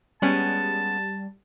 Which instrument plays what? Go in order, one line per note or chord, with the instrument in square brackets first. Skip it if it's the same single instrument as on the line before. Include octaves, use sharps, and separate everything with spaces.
[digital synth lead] G3 [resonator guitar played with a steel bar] G#3 B3 C#4 [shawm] A5